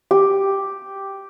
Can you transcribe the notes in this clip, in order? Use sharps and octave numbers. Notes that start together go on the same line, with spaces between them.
G4